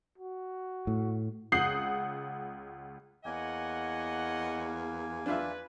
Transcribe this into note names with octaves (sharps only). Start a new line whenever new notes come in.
F#4
A2
C#2 F#5 D#6 G6 C7 F#7
E2 A#3 C#5 D#5 F#5 G#5
D4 F4 B4 E5